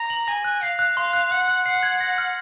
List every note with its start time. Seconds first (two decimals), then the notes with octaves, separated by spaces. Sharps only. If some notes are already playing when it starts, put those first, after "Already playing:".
Already playing: A#5
0.10 F#7
0.28 G#5 A#6
0.45 F#6
0.62 F5 C7
0.79 F#6
0.97 F5 C6
1.13 F#6
1.31 F#5 F#6
1.48 F#6
1.65 F#5 C7
1.83 G#6
2.01 A#6
2.18 F6